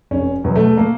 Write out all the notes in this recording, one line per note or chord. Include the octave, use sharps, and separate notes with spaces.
F1 C#4
E2 B2 F#3
A3
A#3